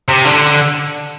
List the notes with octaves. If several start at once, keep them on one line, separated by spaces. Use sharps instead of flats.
C3
D3